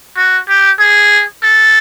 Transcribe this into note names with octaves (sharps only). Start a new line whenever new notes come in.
F#4
G4
G#4
A4